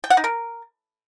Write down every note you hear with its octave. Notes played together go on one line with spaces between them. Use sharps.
G5
F#5
D#4
A#4